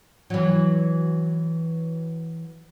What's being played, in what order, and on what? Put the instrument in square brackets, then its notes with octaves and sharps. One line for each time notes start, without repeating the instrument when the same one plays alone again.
[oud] E3 F#3